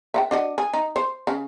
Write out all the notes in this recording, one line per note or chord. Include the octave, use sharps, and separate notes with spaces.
E5 F#5 G5
D4 F#4 D#5
G#4
D#4
C5
C#3